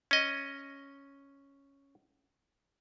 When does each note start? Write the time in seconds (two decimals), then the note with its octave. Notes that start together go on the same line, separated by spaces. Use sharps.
0.11 C#4 D#5